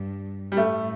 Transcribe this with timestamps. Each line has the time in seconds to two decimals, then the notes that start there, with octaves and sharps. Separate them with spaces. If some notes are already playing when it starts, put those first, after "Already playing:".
Already playing: G2
0.52 G3
0.57 A2 A3